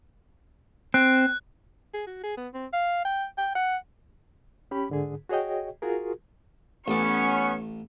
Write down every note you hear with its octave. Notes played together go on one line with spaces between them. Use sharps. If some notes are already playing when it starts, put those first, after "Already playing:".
C4 F#6
G#4
F#4
G#4
B3
C4
F5
G5
G5
F#5
C#4 G4 B5
G#2 D3 G#4
F#4 G#4 C#5 D#5 G5
F4 F#4 G#4 A#4
A1 B3 C#4 D5 C#6